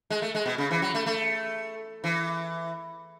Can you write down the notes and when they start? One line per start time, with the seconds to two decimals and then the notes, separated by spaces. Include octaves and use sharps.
0.10 G#3
0.22 A3
0.35 G#3
0.46 B2
0.58 C#3
0.71 E3
0.82 F#3
0.95 A3
1.06 A3
2.04 E3